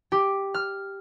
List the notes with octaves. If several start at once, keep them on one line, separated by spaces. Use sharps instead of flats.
G4
F6